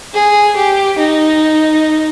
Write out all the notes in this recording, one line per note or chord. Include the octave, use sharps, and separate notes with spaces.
G#4
G4
D#4